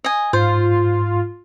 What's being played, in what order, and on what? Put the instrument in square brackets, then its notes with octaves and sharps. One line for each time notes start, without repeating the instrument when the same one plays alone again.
[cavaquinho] D#5 G#5
[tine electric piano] G#2 [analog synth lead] F4 [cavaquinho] C5